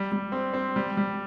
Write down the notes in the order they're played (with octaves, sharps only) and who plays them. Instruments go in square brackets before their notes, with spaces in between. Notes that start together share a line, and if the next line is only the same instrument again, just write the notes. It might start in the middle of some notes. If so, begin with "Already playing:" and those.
Already playing: [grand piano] G3
G3
C4
C4
G3
G3